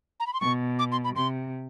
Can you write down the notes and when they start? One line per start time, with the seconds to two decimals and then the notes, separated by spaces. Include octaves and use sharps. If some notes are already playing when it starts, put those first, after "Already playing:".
0.20 A#5
0.27 B5
0.33 C6
0.41 B2 C#6
0.79 D6
0.92 C6
1.04 B5
1.16 C3 C6